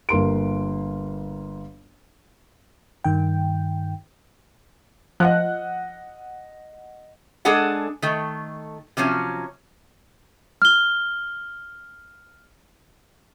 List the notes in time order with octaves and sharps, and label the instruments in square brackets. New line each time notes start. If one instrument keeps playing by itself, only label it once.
[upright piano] G1 A#3 C6 D7
[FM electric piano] G2 D#3 G5
[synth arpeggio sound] F3 [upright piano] D#5 F#5 F#6
[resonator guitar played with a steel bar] G#3 D4 G#4 A4 F#5
D#3 A3
C3 F3 F#3 C#4
[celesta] F6 G7